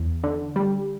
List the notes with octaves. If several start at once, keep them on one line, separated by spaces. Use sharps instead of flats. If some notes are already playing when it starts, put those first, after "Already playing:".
Already playing: E2
D3
G3